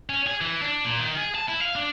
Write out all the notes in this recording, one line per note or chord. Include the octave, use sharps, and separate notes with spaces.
C#4
G#4
E3
D4
A#2
D#3
G#4
A5
E4
F5
D4